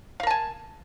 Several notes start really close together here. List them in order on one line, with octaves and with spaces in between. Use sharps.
F5 A#4 A5 G#5